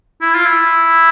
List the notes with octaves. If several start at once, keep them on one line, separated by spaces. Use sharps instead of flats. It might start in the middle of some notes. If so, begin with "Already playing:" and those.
E4
F4
E4